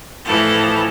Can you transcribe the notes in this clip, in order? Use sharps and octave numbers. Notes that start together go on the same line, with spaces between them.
A2 E3 F3 A4